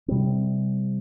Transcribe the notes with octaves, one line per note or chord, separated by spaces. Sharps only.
C3 G3 C4